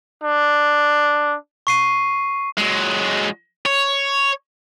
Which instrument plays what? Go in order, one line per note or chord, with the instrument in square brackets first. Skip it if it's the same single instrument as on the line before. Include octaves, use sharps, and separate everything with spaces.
[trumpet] D4
[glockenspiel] C#6 C7 D#7
[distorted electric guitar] F#3 G#3
C#5